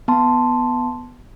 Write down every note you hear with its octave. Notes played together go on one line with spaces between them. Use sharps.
B3 A5 C6